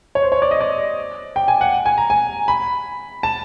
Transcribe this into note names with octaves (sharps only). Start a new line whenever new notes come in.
C#5
C5
C#5
D5
D#5
D5
G5
G#5
F#5
G#5
A#5
G#5
B5
A5